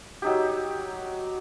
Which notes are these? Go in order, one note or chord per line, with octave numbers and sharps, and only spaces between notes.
F#3 D#4 G4